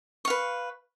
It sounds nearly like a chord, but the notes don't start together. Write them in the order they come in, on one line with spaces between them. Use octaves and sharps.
C#6 F5 B4